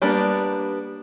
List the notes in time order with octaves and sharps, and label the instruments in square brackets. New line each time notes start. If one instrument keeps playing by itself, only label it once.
[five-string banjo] G3 A#3 B3 D4